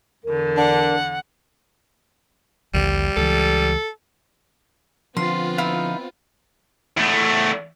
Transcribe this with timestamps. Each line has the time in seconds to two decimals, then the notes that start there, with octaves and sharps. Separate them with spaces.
0.25 E2 D3 A#4
0.57 D4 F#5
2.74 A#1 D#2 D3 G3
3.17 C#2 E3 A4
5.17 D3 F3 B3 C4 F4 C6
5.58 D#4 E4 F5
6.97 E2 A3